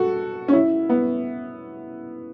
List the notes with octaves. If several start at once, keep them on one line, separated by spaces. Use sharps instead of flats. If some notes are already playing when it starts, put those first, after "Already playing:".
Already playing: F#4 A4
C#4
E4
B3